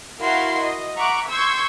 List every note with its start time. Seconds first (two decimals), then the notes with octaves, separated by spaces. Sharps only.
0.21 E4 F#4 A#4 F5 C6
0.60 D#5
0.98 E5 F#5 A#5 C#6 D6 F#6
1.31 C6 C#6 E6 G6 G#6